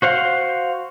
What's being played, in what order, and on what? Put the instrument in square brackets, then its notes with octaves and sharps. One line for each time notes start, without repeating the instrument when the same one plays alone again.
[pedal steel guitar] F#4 C5 F5 F#5